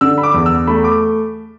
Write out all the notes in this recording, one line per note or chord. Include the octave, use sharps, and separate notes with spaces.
D3 E6
B5
D6
E2
E6
A3 B5
D6